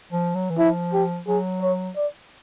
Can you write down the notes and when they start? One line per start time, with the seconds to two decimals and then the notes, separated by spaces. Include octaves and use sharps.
0.13 F3
0.35 F#3
0.50 E3
0.59 F3 E4
0.93 G4
1.28 F#3 G#4
1.62 C#5
1.97 D5